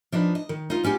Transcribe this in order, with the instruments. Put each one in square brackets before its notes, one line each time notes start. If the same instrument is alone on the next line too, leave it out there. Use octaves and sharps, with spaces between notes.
[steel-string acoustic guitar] F3 D4 D#4 B4
D#5
D#3
D#4 F4
B3 C#4 F4 G4